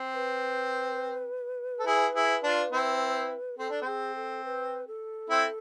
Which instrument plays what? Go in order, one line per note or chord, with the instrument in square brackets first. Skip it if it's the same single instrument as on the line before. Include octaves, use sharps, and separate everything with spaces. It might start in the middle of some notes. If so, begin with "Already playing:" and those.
Already playing: [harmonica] C4
[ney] B4
[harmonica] A4
E4 G#4
E4 G#4
D4 F4
C4 E4
[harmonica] C4 [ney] A4
[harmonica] D4
[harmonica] C4 [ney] G#4
[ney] A4
B4
A4
[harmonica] C4 E4